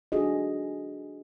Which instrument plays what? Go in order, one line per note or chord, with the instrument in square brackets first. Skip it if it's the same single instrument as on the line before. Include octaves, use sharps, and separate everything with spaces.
[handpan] D4 F#4 G#4 A4 D#5